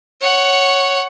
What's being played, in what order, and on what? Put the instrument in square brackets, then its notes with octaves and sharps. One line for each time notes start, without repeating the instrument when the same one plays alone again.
[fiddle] C#5 F#5